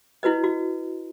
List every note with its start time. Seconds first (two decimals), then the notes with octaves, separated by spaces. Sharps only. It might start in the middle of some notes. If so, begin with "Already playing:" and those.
0.23 E4 F#4 B4 D#5
0.44 F#4